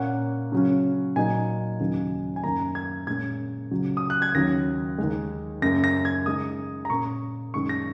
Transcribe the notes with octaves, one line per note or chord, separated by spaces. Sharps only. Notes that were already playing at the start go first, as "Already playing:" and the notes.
Already playing: A#2 A#3 C#4 F#5
C#3 F#3 C#4
A#2 F#3 D#4 G#5
D#2 C#3 F#3 D#4
G#5
F#2 D#3 A#3 A#5
G#6
A#2 G#3 C#4 G#6
C#2 C#3 F#3
D#6
F#6
G#6
D#2 C#3 F#3 C#4 A#6
D#2 D#3 G#3
F#2 C#3 A#3 A#6
A#6
G#6
C#3 G#3 D#4 D#6
A#5
A#2 A#3 C#4 C#6
F#2 D#3 G#3 C#4 C#6
A#6